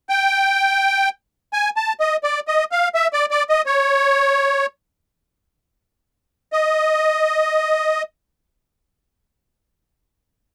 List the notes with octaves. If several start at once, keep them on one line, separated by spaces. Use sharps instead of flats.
G5
G#5
A5
D#5
D5
D#5
F5
E5
D5
D5
D#5
C#5
D#5